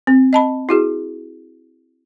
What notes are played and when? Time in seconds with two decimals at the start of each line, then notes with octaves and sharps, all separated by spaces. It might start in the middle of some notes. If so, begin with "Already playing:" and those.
0.07 C4
0.33 D#5 A5 B5
0.69 E4 F#4 G#4